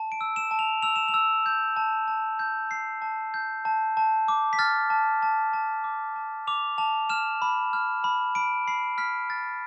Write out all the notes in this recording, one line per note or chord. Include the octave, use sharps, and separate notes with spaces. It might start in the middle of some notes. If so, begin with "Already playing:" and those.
Already playing: A5
D7
E6
E7
A5
F7
E6 F7
E7
F7
E6
G6
A5
A5
G6
G6 C7
A5
G6
A5
A5
D6
B6
F6 A6
A5
A5
A5
D6
A5
D6 F7
A5 F7
F6 E7
B5
F6
B5
B5 D7
B5 C7
F6 B6
F6 A6